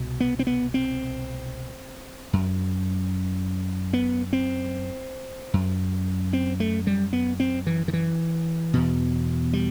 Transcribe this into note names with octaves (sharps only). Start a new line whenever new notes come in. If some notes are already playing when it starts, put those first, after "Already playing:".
Already playing: C2 B2
B3
C4
B3
C4
F#2
B3
C4
F#2
C4
A3
G3
B3
C4
E3
D#3
E3
E2 B2
G3